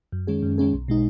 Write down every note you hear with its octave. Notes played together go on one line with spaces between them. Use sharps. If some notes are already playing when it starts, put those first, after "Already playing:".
F#2
D#3 G#3 C#4 G#4
F#2
D#3 G#3 C#4 G#4
B1
B2 G#3 D#4